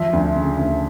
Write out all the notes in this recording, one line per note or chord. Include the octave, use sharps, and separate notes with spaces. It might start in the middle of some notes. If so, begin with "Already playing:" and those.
Already playing: F3 E5
D2
C#3
D2